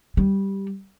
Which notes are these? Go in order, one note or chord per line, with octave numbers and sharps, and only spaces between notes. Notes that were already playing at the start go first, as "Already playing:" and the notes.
G3